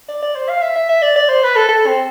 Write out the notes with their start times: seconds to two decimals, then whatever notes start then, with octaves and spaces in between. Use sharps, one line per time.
0.08 D5
0.23 D5
0.35 C5
0.49 F5
0.62 E5
0.76 E5
0.89 E5
1.02 D5
1.16 D5
1.29 C5
1.43 B4
1.56 A4
1.69 A4
1.87 C4